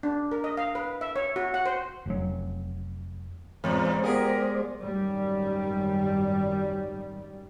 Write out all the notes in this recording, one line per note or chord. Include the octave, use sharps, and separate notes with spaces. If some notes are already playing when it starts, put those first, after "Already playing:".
D4
A#4
D#5
F5
B4
E5
C#5
F#4
F#5
C5
F1 F#3
A1 E2 G#3 C5 D5
B3 F4 G4 G#4 A#4
G#1 F#2 D#3 G3